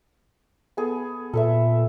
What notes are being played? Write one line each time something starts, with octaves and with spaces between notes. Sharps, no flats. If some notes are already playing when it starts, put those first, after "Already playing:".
B3 G#4 A4
A#2 A4 B4 E5